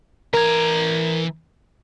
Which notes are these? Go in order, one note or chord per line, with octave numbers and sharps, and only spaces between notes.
E3 A#4 A#5 G#6